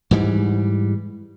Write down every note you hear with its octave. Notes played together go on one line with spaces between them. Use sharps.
G#2 E3 G3